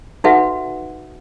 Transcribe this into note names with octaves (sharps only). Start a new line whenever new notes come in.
D#4 F#4 A4 B4 E5 F#5